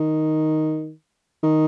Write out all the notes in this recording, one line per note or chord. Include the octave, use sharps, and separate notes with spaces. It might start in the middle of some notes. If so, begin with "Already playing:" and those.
Already playing: D#3
D#3